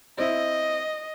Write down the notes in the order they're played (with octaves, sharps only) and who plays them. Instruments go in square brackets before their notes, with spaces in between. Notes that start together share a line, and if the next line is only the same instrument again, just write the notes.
[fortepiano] C4 E4 [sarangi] D#5